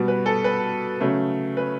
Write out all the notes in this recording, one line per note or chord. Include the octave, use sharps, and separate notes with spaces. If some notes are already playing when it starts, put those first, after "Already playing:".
Already playing: B2 G3 B3
B4
A4
B4
C#3 F#3 A3
B4